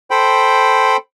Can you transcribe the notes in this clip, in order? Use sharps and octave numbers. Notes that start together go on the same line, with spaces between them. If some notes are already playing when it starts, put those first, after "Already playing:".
A4 C5 G5 B5